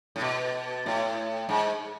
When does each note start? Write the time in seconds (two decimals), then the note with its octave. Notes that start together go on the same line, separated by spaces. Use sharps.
0.16 A2
0.21 B2
0.86 A2
1.49 G#2